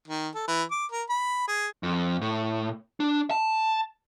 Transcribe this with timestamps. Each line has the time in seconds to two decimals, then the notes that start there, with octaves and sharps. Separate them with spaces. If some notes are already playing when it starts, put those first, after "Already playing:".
0.08 D#3
0.35 A4
0.48 E3
0.71 D6
0.91 A#4
1.09 B5
1.48 G#4
1.83 F2
2.21 A2
3.00 D4
3.31 A5